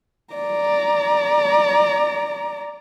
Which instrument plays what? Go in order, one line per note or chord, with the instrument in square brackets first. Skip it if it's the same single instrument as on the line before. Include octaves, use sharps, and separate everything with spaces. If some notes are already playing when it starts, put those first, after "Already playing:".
[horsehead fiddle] D5 A#5